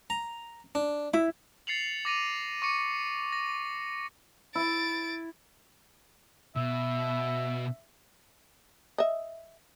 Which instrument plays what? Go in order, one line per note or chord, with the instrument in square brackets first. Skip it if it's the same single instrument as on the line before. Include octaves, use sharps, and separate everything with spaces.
[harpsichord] A#5
D4
[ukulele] E4 [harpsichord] B5
[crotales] A6 C7 C#7 F7 F#7
D6 A#6 D#7 F7
C#6 D6 C#7
A#6
[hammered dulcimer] E4 [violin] A6 D7
[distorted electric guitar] B2 [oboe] E5
[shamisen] D#5 E5